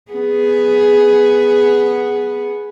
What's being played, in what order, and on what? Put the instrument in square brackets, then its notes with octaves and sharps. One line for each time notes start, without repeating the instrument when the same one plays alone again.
[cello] B3 G#4